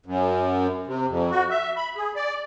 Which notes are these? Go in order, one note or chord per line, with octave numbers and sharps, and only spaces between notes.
F#2
C3
F2
F#4
E5
B5
G#4
D5